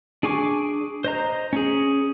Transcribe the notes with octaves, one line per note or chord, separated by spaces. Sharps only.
D4 G#4 G#5 C#6 D6
C5 D#5 A#5
C#4 G#4